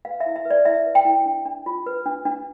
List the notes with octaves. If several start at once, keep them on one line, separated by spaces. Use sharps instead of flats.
B4 F5
E5
E4
E5
B4
D5
E4 E5
B4
G5
E4
D4
D4
F4
B4
D4
D4